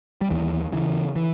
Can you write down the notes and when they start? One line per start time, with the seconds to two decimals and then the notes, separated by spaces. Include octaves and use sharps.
0.21 G3
0.30 D#2 E3
0.72 C#3 E3
1.16 E3